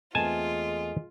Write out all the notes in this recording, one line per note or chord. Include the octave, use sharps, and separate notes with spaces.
E2 G#3 A3 C4 F4 G#5 A5